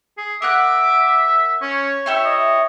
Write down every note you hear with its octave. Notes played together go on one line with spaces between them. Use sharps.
G#4
A#4 E5 F#5 D6 F#6
C#4 C#5
E4 G4 C#5 E5
D#5